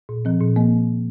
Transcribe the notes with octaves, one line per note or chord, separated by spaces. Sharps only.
A#2
F3 C4
A#2
F3 A#3